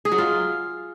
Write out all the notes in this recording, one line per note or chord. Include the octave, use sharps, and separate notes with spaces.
G#4
F#3
F4